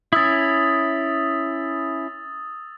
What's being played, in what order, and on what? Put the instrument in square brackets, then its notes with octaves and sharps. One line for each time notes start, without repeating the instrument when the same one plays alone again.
[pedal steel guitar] C#4 E4 [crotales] D#6 E6 A6